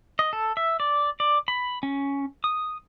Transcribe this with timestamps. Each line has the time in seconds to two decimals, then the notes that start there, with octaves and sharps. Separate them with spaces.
0.19 D#5
0.33 A4
0.57 E5
0.80 D5
1.20 D5
1.48 B5
1.83 C#4
2.44 D#6